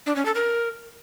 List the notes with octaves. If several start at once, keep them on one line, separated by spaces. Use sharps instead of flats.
D4
C#4
A4
A#4